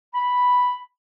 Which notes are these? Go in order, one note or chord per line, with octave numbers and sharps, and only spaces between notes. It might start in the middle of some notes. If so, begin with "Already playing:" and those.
B5